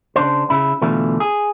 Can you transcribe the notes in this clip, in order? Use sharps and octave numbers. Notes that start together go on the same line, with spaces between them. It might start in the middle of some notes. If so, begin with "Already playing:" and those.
C#3 D4 C5
C#3 E4
B2 D3 E3 A3 F4
G#4